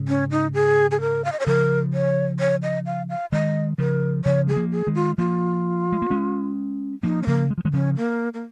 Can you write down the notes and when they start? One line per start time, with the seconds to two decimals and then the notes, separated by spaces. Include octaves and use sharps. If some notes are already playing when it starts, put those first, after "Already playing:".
Already playing: G#2 C#3
0.08 C#4
0.31 D#4
0.54 G#4
0.91 G#4
1.01 A#4
1.25 F5
1.32 D#5
1.40 C#5
1.47 C#3 F3 A#4
1.93 C#5
2.40 C#5
2.63 D#5
2.86 F5
3.10 F5
3.32 D#3 G#3 D#5
3.78 C#3 F3 A#4
4.25 C#3 F3 C#5
4.47 G#3 G#4
4.56 F3 A#3
4.72 G#4
4.87 D#3 G#3
4.95 F4
5.18 F3 A#3 F4
5.92 G#3
6.02 A#3
6.10 G#3 C#4
7.03 F3 A#3 D#4
7.23 C#4
7.27 C#3 F3 A#3
7.50 G#3
7.58 F3
7.65 D#3 G#3
7.73 C#3 F3 C#4
7.96 A#3
8.34 A#3